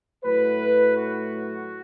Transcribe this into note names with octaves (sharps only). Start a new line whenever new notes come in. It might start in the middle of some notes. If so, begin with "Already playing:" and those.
A2 F#3 A3 B4
F#4